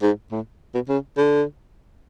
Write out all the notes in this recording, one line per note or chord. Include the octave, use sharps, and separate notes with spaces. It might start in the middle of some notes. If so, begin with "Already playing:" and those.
G#2
A2
B2
C#3
D3